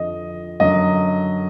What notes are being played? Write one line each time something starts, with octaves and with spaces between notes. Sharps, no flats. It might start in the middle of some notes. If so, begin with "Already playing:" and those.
Already playing: F2 D3 F3 D#5
F#2 D3 F#3 D#5